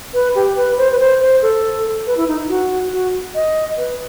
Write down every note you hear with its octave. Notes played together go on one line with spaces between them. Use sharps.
B4
G4
B4
C5
B4
C5
C5
A4
B4
E4
D#4
F#4
F#4
D#5
B4